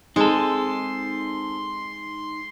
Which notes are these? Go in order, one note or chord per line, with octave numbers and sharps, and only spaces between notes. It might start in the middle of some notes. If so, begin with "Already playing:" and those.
G#3 C4 D#4 A4 C6